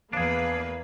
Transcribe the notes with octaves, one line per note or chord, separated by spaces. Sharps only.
E2 A#3 D4 G#4 B4 F5